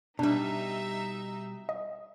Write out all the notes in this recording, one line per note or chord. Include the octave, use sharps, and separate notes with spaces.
B2 G3 D4 D#4 E5
D#5